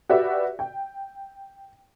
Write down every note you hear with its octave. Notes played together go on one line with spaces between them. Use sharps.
F#4 G4 B4 D5 E5 F#5
G5